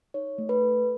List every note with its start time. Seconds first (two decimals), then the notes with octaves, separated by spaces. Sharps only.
0.14 D#4 C#5
0.38 A3
0.49 B4
0.62 A4